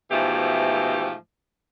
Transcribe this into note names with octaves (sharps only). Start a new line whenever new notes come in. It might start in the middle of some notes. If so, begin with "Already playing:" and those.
G#2 B2 E3 F3 A3 G4